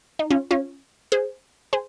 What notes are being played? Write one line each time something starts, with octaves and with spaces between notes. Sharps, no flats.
D#4
C#4 F4
C#4 F4
G#4 C5
G#4 C5